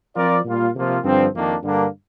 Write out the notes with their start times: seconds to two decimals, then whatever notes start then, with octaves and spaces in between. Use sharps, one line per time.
0.15 F3 C4 F4 A#4 D5
0.45 A#2 G3 A#3 F4
0.74 C3 F3 A#3 F4
1.04 G2 D3 F3 C4
1.33 F2 D#3 A#3 D4
1.62 G2 D3 G3 A#3 D4